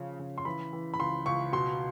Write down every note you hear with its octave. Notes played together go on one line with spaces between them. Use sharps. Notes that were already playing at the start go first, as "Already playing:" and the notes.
Already playing: C#3 F3 C#4
C#3
C6
E3 B5
E3
B5
C#2 C6
C#2 C#6
B2 C6